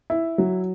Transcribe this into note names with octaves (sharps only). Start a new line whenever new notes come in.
E4
F#3